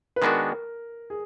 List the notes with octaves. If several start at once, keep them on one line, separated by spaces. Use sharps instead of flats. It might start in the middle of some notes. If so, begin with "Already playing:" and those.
B4
D#3 G#3 B3 D4 F#4 A#4
G#4